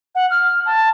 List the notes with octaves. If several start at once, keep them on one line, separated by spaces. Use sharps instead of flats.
F#5
F6
A5